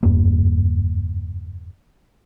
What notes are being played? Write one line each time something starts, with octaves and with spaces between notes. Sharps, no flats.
F#1 E2 G2 A#3